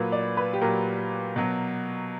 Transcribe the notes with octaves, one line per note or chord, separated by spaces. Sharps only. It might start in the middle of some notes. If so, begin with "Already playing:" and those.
Already playing: A#2 F#3 B4
D5
B4
G4
A#2 F#3 A#4
B2 F#3